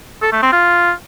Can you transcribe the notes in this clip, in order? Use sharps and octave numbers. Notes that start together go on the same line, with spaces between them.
A4
A3
C4
F4